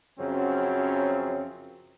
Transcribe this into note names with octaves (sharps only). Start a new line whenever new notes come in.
F#2 C#3 F3 F#3 C4